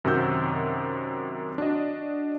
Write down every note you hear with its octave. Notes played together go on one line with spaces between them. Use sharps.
F#2 C3 D#3 F#4 E6 G6
D4 F#4 D#5